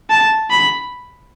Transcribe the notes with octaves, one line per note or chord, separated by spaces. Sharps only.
A5
B5